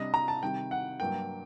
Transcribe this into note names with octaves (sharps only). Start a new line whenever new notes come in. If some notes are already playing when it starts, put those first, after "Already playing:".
Already playing: C3 G3 D4 D#5
A#5
A5
C3 D#3 G3 G5
F#5
G2 F#3 A#3 G5